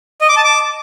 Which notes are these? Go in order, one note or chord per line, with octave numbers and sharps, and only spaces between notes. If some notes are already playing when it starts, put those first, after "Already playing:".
D#5
D6
A5
D6